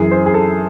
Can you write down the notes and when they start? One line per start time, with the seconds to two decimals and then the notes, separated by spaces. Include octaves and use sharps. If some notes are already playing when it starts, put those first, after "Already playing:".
Already playing: F#2 E3 G#4
0.11 C5
0.26 G#4
0.34 A4